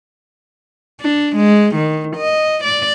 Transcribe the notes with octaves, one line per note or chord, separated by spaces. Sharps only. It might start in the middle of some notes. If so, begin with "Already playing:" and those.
D4
G#3
D#3
D#5
D5